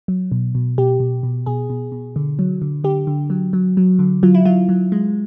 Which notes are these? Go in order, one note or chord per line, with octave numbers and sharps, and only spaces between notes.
F#3
B2
B2
B2 G4
B2
B2
B2 G#4
B2
B2
D3
F#3
D3
D3 G4
D3
F#3
F#3
F#3
D3
F#3 F4
E4
F#3 F4
F#3
G#3